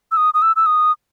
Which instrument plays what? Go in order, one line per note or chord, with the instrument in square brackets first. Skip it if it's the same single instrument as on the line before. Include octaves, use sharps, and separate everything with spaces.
[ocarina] E6
D#6
D#6
E6
E6
D#6